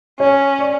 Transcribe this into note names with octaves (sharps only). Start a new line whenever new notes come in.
C#4 C#5
D5